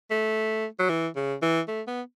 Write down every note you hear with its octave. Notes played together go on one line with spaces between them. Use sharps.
A3
F#3
E3
C#3
E3
A3
B3